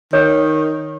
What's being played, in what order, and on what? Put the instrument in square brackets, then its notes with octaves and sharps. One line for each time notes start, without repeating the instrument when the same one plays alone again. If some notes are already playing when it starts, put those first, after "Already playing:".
[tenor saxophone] D#3 [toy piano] C#5